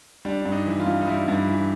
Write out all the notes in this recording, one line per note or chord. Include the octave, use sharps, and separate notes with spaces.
G3 D4
G2 D4
D#4
E3
F4
G2
D#4
G3 E4
G2
E3